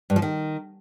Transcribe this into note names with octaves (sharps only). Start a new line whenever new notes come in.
G2
F3
D#3